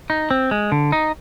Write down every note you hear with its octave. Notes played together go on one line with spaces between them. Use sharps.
D#4
C4
G#3
D3
D#4